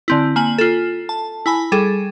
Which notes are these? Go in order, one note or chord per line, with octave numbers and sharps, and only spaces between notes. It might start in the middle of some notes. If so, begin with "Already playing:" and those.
D3 C4 E4
A#3 G#5 F#7
F4 A4
A5
E4 G#5 B5
G3 G#4 A4